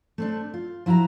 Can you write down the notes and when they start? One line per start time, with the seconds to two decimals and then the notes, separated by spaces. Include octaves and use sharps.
0.18 A3 C4 D4
0.54 F4
0.86 F3 E4 F#4 G5 A#5